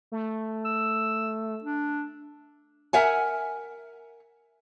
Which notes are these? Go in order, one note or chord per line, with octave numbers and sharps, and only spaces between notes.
A3
E6
D4
A#4 E5 F#5 G#5